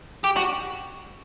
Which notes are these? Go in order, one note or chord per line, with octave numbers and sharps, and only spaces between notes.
G4
F#4